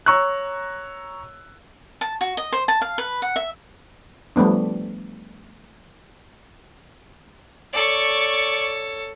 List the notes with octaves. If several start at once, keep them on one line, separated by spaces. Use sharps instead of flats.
C#5 A#5 C#6 E6 F#6
A5
F#4
D#5
C5
A5
F5
B4
F#5
E5
F3 G3 A3 B3 D4
A4 C#5 D5 C#6